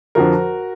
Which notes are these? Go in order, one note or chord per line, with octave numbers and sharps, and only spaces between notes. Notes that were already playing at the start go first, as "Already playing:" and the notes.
F2 D3 F3 F#4 A#4